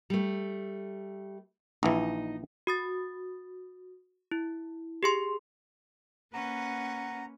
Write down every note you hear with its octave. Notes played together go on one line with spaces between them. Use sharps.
G3 A3
A#1 E3 D#4 D#5
F#4 D#6 A6
E4
G4 G#4 C6
A#3 C#4 B4 F#5 A#5